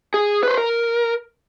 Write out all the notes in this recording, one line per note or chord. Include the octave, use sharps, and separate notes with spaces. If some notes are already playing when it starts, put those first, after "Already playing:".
G#4
B4 C5
A#4